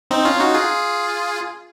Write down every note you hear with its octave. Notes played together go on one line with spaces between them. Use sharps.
C4 D#4
C#4 F4
D#4 F#4
F4 G#4